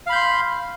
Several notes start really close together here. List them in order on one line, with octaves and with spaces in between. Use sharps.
F5 B5 G6 C6